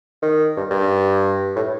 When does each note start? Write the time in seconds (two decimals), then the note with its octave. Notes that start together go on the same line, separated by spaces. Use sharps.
0.22 D#3
0.57 G2
0.71 G2
1.56 A2